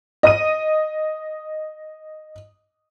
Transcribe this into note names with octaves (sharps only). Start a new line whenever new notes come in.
D#5 D#6 D#7